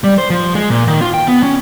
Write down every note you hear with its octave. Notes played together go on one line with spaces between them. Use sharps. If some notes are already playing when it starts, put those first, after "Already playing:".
G3
C5
F3
G#3
A#2
D#3
F4
G5
B3
C#4